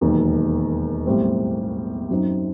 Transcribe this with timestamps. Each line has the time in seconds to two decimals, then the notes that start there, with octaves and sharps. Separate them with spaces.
0.01 E1 D#2 D#3 F#3
1.06 B1 A2 G3 C4
2.10 F#2 F#3 C4 D#4